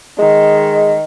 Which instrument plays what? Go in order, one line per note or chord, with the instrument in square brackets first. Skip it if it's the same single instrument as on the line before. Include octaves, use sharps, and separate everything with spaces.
[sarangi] D#3 [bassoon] G#3